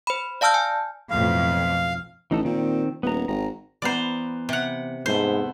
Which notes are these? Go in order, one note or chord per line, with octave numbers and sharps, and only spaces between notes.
C5 B5
D5 F5 A5 E6 F6 G6
G#5
B1 F2 A2 F5
A1 E3 D#4 A4
A#2 D#3 C4
D#1 B3 A#5
G#1 A#5
E3 B3 C5 D5 A#5
C3 F#5
E2 G#2 A3 B3 C5